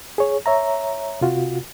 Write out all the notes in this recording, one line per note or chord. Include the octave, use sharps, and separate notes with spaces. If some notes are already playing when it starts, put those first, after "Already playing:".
G#4 C#5
C#5 E5 A#5
C3 F4 F#4